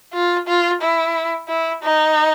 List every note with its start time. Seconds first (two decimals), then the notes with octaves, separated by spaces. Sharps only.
0.13 F4
0.47 F4
0.81 E4
1.48 E4
1.83 D#4